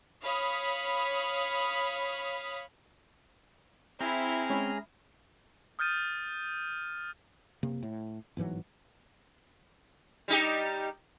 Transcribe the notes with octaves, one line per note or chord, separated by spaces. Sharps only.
C#5 F5 B5 D#6
C4 E4 G#4 A#5 F6
G#3 C#4
D#6 F6 G6 A6 D#7
F#1 C3 A#3
A2
G1 G#2 E3 F#3
G3 D#4 G4